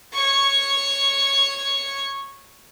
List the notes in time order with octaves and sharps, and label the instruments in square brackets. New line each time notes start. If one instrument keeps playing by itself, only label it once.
[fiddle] C#5 C#6